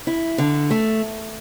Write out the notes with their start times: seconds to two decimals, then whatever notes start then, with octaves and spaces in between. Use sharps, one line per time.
0.07 E4
0.38 D3
0.70 A3